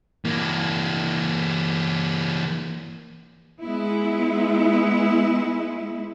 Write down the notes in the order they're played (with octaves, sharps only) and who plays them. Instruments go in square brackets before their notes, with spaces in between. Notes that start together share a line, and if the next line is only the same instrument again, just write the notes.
[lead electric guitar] E3 A#3
[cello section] G#3 B3 E4